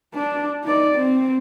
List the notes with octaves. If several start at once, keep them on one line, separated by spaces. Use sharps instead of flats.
D4
D#4 D5
C4